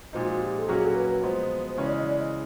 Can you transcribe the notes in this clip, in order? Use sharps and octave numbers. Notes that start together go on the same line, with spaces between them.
A#2 F3 G#3 C4 D#4 F#4
F#4
G4
A4
A#2 F#3 A#3 C#4 F#4 G#4
A4
B4
B4
F3 G#3 B3 C5
C5
C#3 E3 G#3 C#4 C#5
D5
D#5
D5
D#5